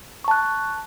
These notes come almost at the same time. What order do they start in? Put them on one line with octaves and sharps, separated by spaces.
C#6 A5 F#6